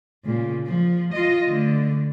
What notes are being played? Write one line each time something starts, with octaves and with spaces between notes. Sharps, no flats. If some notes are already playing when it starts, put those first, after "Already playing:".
A#2 C#3
F3
F4 D#5
D3 A3